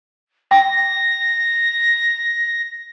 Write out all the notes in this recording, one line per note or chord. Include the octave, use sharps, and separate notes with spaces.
G5 A#6